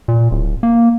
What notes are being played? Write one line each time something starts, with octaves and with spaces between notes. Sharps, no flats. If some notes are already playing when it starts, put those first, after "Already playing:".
A#2
D1
A#3